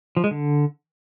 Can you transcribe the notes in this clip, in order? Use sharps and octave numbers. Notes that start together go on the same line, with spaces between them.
F3
G#3
D3